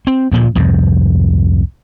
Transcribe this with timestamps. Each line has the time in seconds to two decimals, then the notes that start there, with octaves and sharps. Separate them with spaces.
0.07 C4
0.32 D2 A#2 F3
0.55 C2 F2 G#2